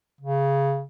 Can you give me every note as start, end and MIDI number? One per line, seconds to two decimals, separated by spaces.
0.21 0.83 49